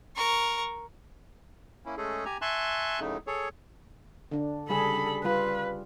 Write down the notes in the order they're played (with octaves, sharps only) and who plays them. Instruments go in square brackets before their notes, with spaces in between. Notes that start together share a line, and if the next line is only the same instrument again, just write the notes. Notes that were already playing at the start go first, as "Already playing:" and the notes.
[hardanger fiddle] A#4 C#6
[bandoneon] A#3 C#4 E4
G#3 A3 C#4 G#4 A4
G4 G#5 A#5
E5 G#5 A5 C6 C#6 F#6
F#2 A2 C#3 A3 D#4
G#4 A4 C#5
[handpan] D3 D4
[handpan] C#3 G3 G#4 [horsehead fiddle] A4 B5
[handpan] G3 F4 [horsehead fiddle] B4